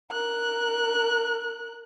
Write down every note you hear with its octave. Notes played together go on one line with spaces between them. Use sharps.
A#4 F#6